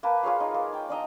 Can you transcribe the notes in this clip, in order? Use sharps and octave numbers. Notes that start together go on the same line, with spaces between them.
A#3 B4 A5
F4 G#4 C#5 F5
D#4
A#3
G5 D6
D4 D5 D#5 A#5